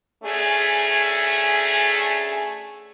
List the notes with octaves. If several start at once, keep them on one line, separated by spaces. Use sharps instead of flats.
D2 A3 C#4 G#4